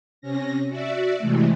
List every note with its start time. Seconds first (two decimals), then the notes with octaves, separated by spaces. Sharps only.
0.21 C3 C#4 A#6
0.69 F#4 D5 E5
1.18 C3 E3 G#3 A3